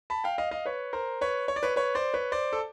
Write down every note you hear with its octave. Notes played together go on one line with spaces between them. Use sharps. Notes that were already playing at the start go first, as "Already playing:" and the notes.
A5 B5
F5 G5
D#5 F5
D#5 F5
B4 C#5
A#4 C5
B4 C#5
C#5
D5
B4 C#5
B4 C#5
C5 D5
B4 C#5
C5 D5
A4